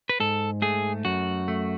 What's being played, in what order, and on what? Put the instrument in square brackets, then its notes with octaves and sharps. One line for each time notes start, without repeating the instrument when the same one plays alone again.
[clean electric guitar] B4
G#2 A4
A3 G#4
F#2 F#4
A3